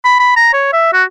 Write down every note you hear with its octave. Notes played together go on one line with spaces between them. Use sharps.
B5
B5
A#5
C#5
E5
F#4